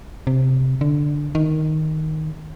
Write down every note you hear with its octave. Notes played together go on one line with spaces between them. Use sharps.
C3
D3
D#3